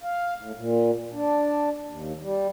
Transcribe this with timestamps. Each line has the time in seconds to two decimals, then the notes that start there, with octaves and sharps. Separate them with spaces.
0.03 F5
0.40 A2
0.57 A#2
1.13 D4
1.87 D#2
2.22 G3